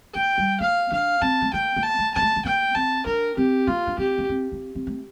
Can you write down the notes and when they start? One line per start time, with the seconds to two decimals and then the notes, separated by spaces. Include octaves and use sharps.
0.14 A#3 G5
0.38 G3
0.60 A#3 F5
0.92 D4 F5
1.22 C4 A5
1.41 A3
1.53 A#3 G5
1.76 A#3
1.83 A5
1.99 A3
2.14 A#3 A5
2.22 A3
2.36 A3
2.45 A#3 G5
2.75 C4 A5
3.06 D4 A#4
3.37 C4 G4
3.67 A#3 F4
3.87 D4
3.98 C4 G4
4.18 A#3
4.29 C4
4.52 C4
4.75 C4
4.87 A3